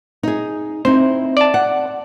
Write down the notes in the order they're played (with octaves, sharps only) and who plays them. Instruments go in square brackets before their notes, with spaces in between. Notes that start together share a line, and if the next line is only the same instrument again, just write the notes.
[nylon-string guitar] D#4 G#4
[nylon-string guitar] C4 D#4 E4 [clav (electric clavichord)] C5
[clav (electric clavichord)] D5 A5
[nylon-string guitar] F#5